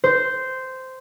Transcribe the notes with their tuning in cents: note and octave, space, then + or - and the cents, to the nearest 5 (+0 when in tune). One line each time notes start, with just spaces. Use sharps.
C5 -10